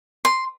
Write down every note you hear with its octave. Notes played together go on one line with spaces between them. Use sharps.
C6